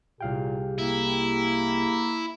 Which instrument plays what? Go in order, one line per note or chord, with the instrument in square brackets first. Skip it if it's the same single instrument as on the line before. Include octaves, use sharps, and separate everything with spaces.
[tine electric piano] C2 F5 G5 [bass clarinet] A#2 [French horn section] G4 G#4
[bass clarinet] A#3 [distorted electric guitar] E4